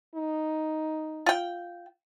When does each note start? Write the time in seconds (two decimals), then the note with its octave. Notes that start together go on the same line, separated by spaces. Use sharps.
0.15 D#4
1.26 F4 G5